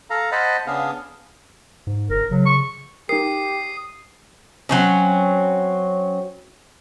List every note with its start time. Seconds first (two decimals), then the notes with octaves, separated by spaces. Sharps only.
0.10 A4 F5 A#5
0.32 C5 D#5 F#5 A5 B5
0.67 C#3 B3 D4 G#4 F5
1.87 G#2
2.10 G1 A#4
2.31 C#3 F#3
2.46 C#6
3.09 D#4 G4 A#4 D#6 C7
4.69 F#3 C4 C#4